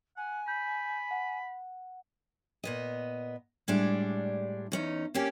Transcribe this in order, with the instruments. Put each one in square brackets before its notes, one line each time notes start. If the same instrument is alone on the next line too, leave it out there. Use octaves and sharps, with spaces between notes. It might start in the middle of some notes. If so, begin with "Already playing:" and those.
[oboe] F#5 [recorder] G#5
[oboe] B5 [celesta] G6
[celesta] F#5
[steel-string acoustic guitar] A#2 B3 D#5
A2 G3 G#3 D4
E2 C#4 D#4
A#3 C4 C#4 G4